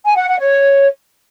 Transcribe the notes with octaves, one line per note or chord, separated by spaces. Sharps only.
G#5
F#5
F#5
C#5